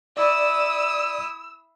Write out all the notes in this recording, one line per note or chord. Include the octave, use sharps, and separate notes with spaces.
E4 D5 D#6 E6